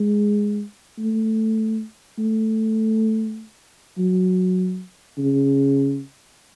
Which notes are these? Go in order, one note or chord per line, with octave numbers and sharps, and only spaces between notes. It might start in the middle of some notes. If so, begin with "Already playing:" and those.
Already playing: G#3
A3
A3
F#3
C#3